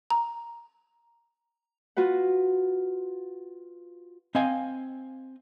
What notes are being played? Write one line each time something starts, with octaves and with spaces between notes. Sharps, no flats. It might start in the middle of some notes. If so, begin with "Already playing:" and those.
A#5
F4 F#4 B4 F#5
C4 D#5 F5 G#5